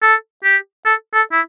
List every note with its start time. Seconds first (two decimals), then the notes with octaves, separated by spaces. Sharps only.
0.02 A4
0.44 G4
0.86 A4
1.14 A4
1.32 E4